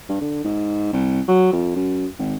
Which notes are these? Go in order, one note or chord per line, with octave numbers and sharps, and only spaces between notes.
G2
D3
G#2
C2
F#3
F2
F#2
G#1